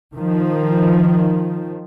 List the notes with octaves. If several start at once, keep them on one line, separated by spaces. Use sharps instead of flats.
D#3 F3